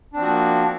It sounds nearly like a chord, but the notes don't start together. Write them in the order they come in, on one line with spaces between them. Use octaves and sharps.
D4 C4 F3 F#4 A#3